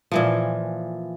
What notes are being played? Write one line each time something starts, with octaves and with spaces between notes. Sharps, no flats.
A#2 E3 F3